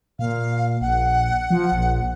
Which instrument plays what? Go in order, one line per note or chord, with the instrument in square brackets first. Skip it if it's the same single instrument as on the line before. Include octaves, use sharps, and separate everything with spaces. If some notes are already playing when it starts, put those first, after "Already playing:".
[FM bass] A#2 [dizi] F5
[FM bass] A#1 [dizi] F#5
[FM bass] F3
A#1